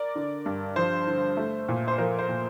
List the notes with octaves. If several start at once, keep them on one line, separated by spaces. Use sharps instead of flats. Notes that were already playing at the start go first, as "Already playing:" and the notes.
Already playing: A#4 D5
D3
G2
F3 C5
D3
A3
A#2
C5
F3 A#4
C5
A#2